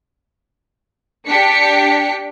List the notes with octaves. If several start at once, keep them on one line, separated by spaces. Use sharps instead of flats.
D4 G4 B6 C#7